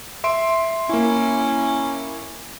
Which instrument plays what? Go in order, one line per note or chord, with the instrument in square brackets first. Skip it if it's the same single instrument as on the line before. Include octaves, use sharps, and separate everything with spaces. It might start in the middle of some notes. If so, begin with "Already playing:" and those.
[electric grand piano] E5 C6 D7
[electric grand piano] A#3 E4 [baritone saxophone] C#4